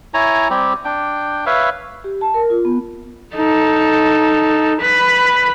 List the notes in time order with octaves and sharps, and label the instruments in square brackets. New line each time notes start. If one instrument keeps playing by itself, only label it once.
[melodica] E4 C#5 G#5 A#5
G3 C4 G4
D4 G5
B4 C#5 E5 F5
[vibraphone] G4
A5
A#4
F4
B3
[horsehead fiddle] D#4 A4
B4 B5